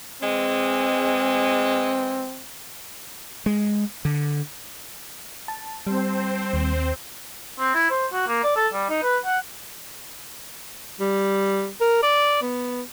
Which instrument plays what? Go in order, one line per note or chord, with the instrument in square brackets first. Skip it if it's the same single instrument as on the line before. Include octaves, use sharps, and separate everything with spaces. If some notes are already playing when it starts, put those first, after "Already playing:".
[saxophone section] E3 G#3 [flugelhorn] C4
[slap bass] G#3
D3
[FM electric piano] A5
[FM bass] G3 [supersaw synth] C4 C5
[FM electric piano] D#2
[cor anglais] C4
E4
C5
F#4
A#3
D5
A4
G3
D#4
B4
F#5
[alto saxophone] G3
A#4
D5
B3